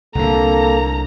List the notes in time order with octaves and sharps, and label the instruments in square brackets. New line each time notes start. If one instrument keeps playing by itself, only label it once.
[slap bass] C2 D3 [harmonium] A#3 A4 [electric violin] A#5